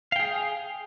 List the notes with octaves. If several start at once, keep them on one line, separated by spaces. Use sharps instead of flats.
G#4 F5 G5